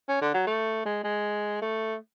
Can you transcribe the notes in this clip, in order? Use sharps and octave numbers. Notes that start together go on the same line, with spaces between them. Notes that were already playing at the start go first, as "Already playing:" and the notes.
C#4
D3
F#3
A3
G#3
G#3
A3